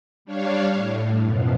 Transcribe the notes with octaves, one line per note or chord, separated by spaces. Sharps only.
G3 D4 C#5 F5
A2
F#2 B2 F3